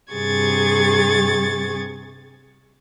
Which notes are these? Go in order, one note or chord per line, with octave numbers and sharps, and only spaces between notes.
G2 C3 G#4 C#6 G#6 A6